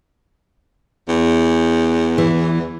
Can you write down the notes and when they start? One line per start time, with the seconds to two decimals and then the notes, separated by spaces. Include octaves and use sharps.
1.09 E2
2.18 E3